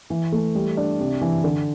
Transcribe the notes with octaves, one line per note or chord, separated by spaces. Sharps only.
E3
A3
G3
D4
C3
E3
D3